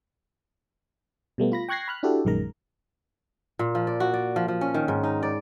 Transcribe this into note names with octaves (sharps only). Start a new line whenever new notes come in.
B2 G3 A3 B3
F4 B5 A#6
G5 C#6 F#6 G#6 A#6 C7
B5 F6 F#6
D4 E4 F#4 G4 A4
A#1 F#2 D#3 G#3 A#4 A#5
A#2
F3
D5
F#4
D5
F3
F3
C#4
D#3
G#2
D#4
D5